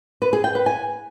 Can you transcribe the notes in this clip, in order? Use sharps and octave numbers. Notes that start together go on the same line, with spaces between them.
B4
G#4
G5
B4
G#5